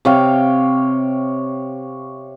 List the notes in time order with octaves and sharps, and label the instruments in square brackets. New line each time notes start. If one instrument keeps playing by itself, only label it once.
[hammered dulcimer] C3 C#5 F5 G5